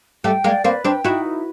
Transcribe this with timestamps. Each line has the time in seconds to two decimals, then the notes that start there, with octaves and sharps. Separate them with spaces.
0.24 G3 A3 G5
0.44 G#3 A#3 D5
0.64 A#3 C4 B4
0.85 C4 D4 G5
1.04 D#4 E4 F#4
1.25 B4